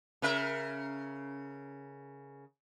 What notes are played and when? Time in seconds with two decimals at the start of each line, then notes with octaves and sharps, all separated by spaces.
0.22 C#3 A#4 E5